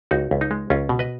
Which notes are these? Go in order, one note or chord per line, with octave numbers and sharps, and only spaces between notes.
C#2 D#4 F#4
C#2
D#4
G#3
C#2 C#4 F4
B2
B4 D#5